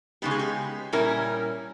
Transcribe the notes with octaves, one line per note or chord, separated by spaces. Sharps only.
C#3 G#3 B3 D#4 G4
G#4
G4
A#2 G3 C#4 E4 A#4